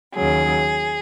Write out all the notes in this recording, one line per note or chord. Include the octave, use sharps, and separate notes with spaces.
D#2 C#3 F#3 G#4